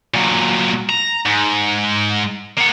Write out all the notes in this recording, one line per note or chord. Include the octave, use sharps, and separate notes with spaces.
A#2 F#3
A#5
G#2
A#3 F#5